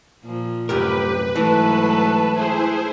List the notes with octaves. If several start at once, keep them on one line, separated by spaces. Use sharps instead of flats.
A#2 F3
C2 F#2 A2 G4 A#4 B4
G#2 E3 F#3 A3 A5
E4 G#4 C5